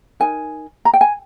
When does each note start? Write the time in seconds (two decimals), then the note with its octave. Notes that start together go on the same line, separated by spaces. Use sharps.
0.20 D#4 A#4 G#5
0.85 A#5
0.93 G5
1.01 G#5